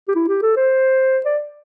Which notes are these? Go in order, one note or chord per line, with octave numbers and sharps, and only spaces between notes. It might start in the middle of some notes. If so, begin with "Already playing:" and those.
G4
E4
G4
A4
C5
D5